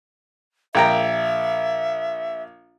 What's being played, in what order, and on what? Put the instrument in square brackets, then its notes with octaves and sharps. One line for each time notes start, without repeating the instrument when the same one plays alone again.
[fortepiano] A#1 G5 A#5 [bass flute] E5